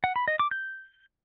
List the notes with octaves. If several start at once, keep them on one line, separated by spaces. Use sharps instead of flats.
F#5
B5
D#5
D6
G6